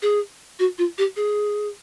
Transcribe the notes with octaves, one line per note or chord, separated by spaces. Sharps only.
G#4
F#4
F4
G4
G#4